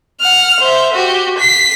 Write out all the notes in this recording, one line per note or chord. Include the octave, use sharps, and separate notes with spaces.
F#5 F6
C5 E5
F#4 G4
B6 C7